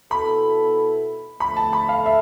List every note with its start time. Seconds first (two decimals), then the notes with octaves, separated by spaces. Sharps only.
0.11 B2 B3 E4 A4 B5
1.40 D3 F3 A3 B5
1.57 A5
1.73 B5
1.89 F5
2.06 E5